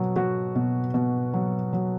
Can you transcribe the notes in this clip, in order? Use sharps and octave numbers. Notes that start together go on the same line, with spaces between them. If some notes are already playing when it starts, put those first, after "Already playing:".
Already playing: B2 F#3
F#3 F#4
B2
B2
F#3
F#3